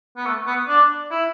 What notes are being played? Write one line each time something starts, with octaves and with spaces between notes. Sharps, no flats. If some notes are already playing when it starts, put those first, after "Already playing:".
B3
A3
B3
D4
E4